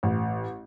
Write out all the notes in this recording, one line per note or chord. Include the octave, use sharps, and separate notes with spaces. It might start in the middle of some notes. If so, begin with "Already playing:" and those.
A1